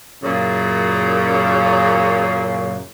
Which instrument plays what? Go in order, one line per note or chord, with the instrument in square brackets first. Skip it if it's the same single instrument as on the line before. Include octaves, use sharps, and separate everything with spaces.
[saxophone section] F#2 A#2 C#3